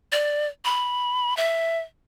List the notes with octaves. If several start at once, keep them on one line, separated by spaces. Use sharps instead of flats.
D5
B5
E5